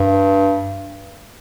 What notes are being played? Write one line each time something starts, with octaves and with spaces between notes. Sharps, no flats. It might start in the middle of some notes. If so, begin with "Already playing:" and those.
Already playing: G2